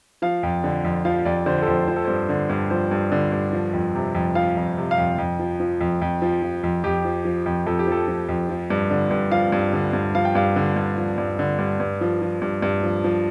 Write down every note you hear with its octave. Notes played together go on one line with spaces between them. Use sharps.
F3 F5
F2
D3
F2
F3 F5
F2 D5
D3 C5
A4
F2 C5
F3 C5
A4
G2 C5
D3
G2
F3 C5
G2
D3
G2
F3
F2
C3
F2
F3 F5
F2
C3
F5
F2
F2
F3
F3
F2
F2
F3
F3
F2
F2 G4
F3
F3
F2
F2 A4
G4
F3 A4
F3
F2
F3
G2
D3
G2
F3 F5
G2
D3
G2
F3 F5
G5
G2 F5
D3
G2
F3
G2
D3
G2
G2
F3
F3
G2
G2
F3
F3